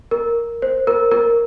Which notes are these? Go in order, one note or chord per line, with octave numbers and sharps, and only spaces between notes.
A#4
C5
A#4
A#4